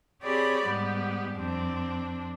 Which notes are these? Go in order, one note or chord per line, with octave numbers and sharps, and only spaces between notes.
C4 G4 G#4 C#5 D5 B5
G#2 G3 B3 G4
F2 C4 D4